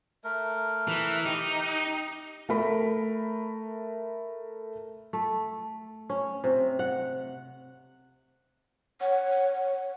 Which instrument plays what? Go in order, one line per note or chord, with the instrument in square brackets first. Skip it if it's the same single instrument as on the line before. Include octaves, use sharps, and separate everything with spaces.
[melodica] A3 A#4
[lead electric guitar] E3
[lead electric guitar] D#4 [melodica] G4
[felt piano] A3 A#4 B5
[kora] A3
C#4
C3
F#5
[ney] C#5 [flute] F#5